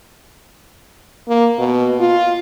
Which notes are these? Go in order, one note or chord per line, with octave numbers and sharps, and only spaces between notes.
A#3
B2
F4